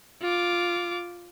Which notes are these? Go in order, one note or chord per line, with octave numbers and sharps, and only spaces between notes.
F4 D6